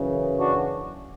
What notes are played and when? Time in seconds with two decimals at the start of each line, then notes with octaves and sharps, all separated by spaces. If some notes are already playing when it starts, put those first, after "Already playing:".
Already playing: F#2 C#3 E3
0.40 D4 F#4